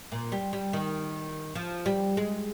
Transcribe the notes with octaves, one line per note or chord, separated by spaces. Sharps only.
A#2
G3
G3
D#3
F3
G3
G#3